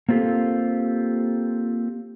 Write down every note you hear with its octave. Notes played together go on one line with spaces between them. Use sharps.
A#3 C4 F4 G4 A4